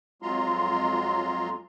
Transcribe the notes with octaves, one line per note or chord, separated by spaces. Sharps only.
F2 F#3 G#3 F4 A#5 C6